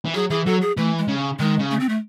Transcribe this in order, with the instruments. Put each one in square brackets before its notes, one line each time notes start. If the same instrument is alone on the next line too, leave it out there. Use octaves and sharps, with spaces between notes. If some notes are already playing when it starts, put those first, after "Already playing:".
[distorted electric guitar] E3
[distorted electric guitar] F#3 [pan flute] G#4
[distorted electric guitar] E3 [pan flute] G#4
[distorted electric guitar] F#3 [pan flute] A4
[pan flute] G#4
[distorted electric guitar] E3 [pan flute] A3
[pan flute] G#3
[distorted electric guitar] C#3
[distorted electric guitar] D#3 [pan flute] G#3
[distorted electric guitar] C#3
[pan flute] A3
C4
A3